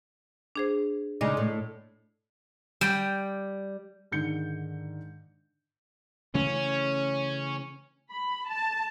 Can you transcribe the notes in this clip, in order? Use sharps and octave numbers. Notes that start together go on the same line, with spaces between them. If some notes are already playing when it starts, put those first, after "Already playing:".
D4 G#4 C5
C#3 G#3 D#4 D5 D#5 D6
A2
G3 G5
G#2 D3 D#3 G6 C#7
C#3 E3 A3 C#4
B5
A5